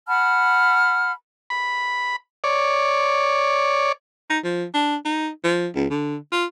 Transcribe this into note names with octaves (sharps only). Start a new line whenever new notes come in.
F#5 A5 B5 F6
B5
C#5 D5
D#4
F3
D4
D#4
F3
C#2
D3
F4